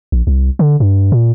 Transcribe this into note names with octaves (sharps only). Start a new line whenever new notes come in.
A#1
C2
D3
G2
A#2